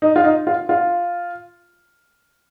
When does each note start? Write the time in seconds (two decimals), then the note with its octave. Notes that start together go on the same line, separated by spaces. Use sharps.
0.02 D#4
0.16 F4
0.24 D#4
0.47 F4
0.69 F4